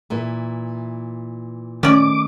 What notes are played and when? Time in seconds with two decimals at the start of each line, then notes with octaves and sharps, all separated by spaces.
0.10 A#2 E3
1.83 D#3 A3 C#4 D5 D6